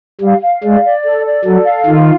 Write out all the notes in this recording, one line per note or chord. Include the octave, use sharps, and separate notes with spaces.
G3 F5
F5
G#3 D5
D5
A4
D5
F#3 A4
F5
D#3 F4